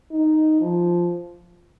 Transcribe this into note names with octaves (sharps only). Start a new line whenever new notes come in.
D#4
F3